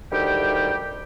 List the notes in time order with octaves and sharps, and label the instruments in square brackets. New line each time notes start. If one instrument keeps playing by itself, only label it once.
[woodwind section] D2 D#3 G3 G4 G5